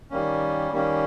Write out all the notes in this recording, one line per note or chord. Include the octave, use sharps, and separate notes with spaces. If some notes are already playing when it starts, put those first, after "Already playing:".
D#3 G3 A#3 C#4
D#3 G3 A#3 C#4